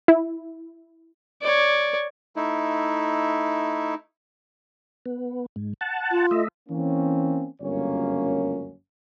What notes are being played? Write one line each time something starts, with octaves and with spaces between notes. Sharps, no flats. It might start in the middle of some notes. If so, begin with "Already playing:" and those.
E4
C#5 D5
A3 D#4 E4
B3
G#2
F#5 A5
F4
A3 D#5 E5
E3 A#3 C4 C#4
G1 C#2 F#2 A#3 C#4 C#5